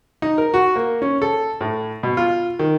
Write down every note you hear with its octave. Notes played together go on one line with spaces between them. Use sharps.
D#4
A#4
F#4
A#3
C#4
A4
A2
B2
F4
D#3